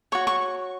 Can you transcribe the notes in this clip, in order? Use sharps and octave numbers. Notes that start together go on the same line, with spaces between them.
F#4 C#5 C#6
C#6